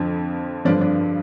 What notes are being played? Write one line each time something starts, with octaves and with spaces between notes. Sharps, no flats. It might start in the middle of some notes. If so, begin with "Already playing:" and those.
Already playing: F2 D3 F3
G2 D3 F3 D4
D4